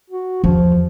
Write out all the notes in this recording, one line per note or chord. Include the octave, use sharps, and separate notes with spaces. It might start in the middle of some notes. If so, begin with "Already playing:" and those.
F#4
E2 F3